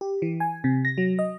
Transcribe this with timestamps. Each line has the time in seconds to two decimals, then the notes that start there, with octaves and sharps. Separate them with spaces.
0.01 G4
0.22 E3
0.40 G#5
0.64 C3
0.85 A#6
0.98 F#3
1.19 D#5